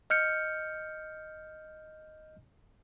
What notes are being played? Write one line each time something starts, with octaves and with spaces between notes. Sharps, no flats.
D#5 F6 G6 C#7